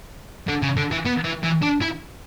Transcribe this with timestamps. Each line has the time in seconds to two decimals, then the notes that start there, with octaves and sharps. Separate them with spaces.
0.48 D3
0.62 C#3
0.77 D3
0.91 E3
1.06 B3
1.25 E3
1.44 E3
1.63 D4
1.82 E4